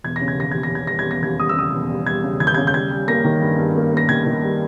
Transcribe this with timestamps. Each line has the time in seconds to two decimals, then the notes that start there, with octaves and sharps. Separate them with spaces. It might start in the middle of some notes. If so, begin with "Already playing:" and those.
0.04 E1 G#6
0.16 A#6
0.21 C#3
0.28 G#6
0.38 D#2 A#6
0.51 D#2 G#6
0.63 A#6
0.71 D#2 G#6
0.87 G3 A#6
0.99 G#6
1.05 E1
1.11 A#6
1.22 D#2 G#6
1.39 G3 D#6
1.49 E6
1.56 C#3 D#6
1.73 E1
1.90 G3
2.06 G3 G#6
2.24 C#3
2.40 D#2 G#6
2.47 G6
2.54 C#3 G#6
2.67 G6
2.74 G3 G#6
2.91 G3
3.08 A#3 A#6
3.24 D#3
3.42 G2
3.58 G2
3.75 A#3
3.92 A#3 A#6
4.09 D#3 G#6
4.26 D#3
4.42 G3